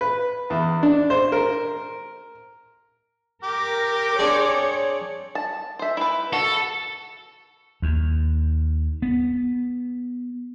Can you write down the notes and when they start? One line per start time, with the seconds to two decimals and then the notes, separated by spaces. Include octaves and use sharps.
0.01 B4
0.50 E2
0.83 D4
1.10 C5
1.32 A#4
3.43 G4 A#4 D6
4.19 C4 D4 G#4 C#5
5.35 A5
5.79 C5 E5
5.97 E4 B4
6.33 F#4 A4
7.82 D#2
9.02 B3